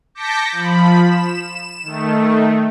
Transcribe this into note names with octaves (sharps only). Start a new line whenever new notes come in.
A5 D6 G6 A#6 B6 C#7
F3 B5
E7
D#3 A3